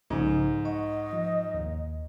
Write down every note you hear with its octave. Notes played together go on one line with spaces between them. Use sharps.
B1 G#2 C#3 F3
D#5 F#5 C#6
F3
D#2